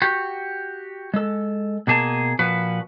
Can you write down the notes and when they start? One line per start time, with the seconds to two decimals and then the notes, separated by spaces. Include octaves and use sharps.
0.02 F#4 G4
1.14 G#3 A4
1.87 B2 A#3 G#4 A5
2.39 A#2 F3 F#4 B4